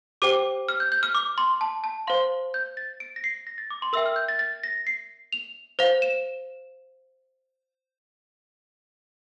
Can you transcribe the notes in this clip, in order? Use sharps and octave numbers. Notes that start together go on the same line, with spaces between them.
G4 C5 G5 D6
F6
G6
G6
F6
D6
C6
A5
A5
C5 F5 C6
G6
A6
D7
A#6
C7
A#6
A6
D6
C6
A#4 E5 G5 E6
F6
G6
A6
A6
A#6
C7
F7
C5 F5 F7
E7